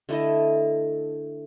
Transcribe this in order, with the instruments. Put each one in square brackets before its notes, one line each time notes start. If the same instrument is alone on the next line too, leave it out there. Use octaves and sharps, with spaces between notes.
[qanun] D3 A3 E4 D#5